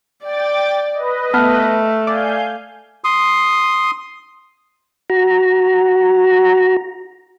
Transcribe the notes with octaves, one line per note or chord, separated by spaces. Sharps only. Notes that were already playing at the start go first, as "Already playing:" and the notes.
D5 G5 D6 A6
B4 D#5
A3 B3 A5 F6
D5 F5 G#5 G6
C6 D#6
F#4 A#5